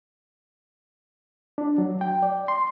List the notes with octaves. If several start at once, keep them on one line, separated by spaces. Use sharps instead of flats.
D4
F#3
G5
D5
C6